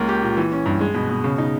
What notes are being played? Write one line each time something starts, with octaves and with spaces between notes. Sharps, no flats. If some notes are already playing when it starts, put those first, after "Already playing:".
Already playing: C#2 A#3
G4
A#2
E3
C#4
G2
G#3
B2
B2
C#3
D#4